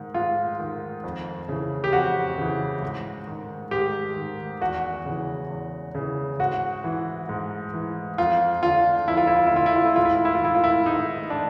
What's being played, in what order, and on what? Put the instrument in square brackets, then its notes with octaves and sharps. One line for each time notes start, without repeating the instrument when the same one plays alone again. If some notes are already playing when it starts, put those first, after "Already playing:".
Already playing: [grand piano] G#2 D#3
G#2 F4
D#3
F2
C#3 E3
G4
F2 F#4
C#3 E3
G#2
D#3
G#2 G4
D#3
E2 F#4
C#3 E3
E2
C#3 E3
G#2 F#4
E3
G#2
E3
F2 F4
D3 F4
F2 E4
F4
E4
F4
E4
D3 F4
E4
F4
E4
G#2 F4
E4
F4
E4
F4
D#3 E4
F4
E4
G#2 D#4
D#3 D4